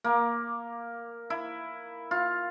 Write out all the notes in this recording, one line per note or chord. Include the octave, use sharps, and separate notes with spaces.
A#3
E4
F4